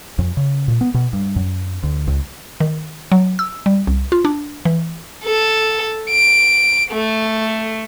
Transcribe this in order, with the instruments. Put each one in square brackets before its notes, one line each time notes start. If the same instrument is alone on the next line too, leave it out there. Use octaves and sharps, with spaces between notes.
[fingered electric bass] F2
C#3
A#2
B3
B2
G2
F#2
D2
C#2
[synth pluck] D#3
F#3
E6
G3
C2
F4
D4
E3
[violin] A4
D7
A3